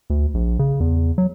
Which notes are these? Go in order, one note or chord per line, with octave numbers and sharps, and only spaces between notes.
D2
A#1
C#3
E2
F#3